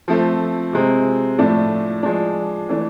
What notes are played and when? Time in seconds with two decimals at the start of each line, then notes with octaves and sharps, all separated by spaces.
0.08 F3 A3 C4
0.73 C3 G#3 C4
1.38 A2 F3 A3 D4
2.03 F3 G#3 D4
2.69 E3 A3 D4